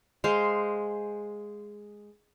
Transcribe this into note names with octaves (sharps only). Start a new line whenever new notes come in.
G#3 C5 F5